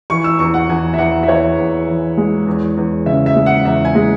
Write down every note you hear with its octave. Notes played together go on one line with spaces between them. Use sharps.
E3 C#6
E6
E2 C#6
F#5
E2 G#5
E5
E2 F#5
E5
E2 C#5
E2
E3
G#3
E2
E2
C#3 E5
E5
G#3
F#5
E2 E5
G#5
G#3